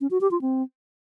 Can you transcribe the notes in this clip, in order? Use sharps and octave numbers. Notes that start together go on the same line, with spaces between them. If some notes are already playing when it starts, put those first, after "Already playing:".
C#4
F#4
G4
F4
C4